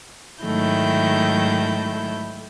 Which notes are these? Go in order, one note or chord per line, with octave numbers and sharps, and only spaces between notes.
G#2 D#3 F#3 A3 E4 G6